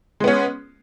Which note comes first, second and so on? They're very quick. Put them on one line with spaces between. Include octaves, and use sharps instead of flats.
G#3 B3 C#4